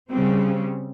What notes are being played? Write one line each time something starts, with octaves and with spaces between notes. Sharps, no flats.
C#3 G3 C4